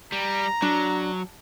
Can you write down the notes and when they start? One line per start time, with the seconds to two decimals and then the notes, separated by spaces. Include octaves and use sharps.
0.12 G3 A#5
0.62 F#3 D4